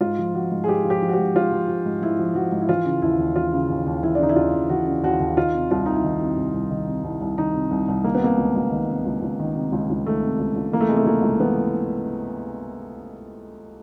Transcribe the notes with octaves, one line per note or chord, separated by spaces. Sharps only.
G#2 F4
F3
F3 F#4
G#2
G#4
G#2 G4
F3
G4
F3
F#4
G4
G#2
G#2 F4
F3
F3
G#2
G#2 E4
F3
F3 F#4
G#2
E4
E3 F4
C#3
D#2 E4
D#2
E3 F4
C#3
D#2
D#2
E3 E4
D4
C#3 D#4
E4
D#2 F4
D#2
E3 F#4
C#3
D#2 F#4
D#2
D#3 F4
C3
C2 F4
E4
C2 D#4
E4
D#3
C3
C2
C2
D#3
C3
C2
C2
D#3 D#4
C3
C2
C2
D#3 A#3
B3
C3 A#3
C#2
C#2
D#3
C3
C#2
C#2
D#3
C3
C#2
C#2
D#3 A3
C3
C#2
C#2
E3 A#3
A3
C3 G#3
A3
C#2 A#3
C#2
E3 B3